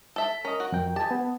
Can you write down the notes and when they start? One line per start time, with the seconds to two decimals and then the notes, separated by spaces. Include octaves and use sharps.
0.16 A4 E5
0.45 C#4 A#4 D#5
0.60 F#4
0.72 F2 A#4 G5
0.96 G4 D#5 G#5 A5
1.11 B3